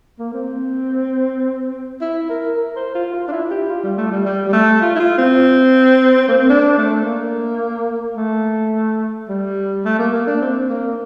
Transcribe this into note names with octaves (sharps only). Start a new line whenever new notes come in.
A#3
C4
E4
A#4
A#4
C5
F4
F4
D4
E4
G4
F4
G3
A3
G3
G3
G3
A3
F4
E4
F4
C4
A#3
C4
D4
A3
A#3
A3
G3
A3
A#3
A#3
D4
C4
A#3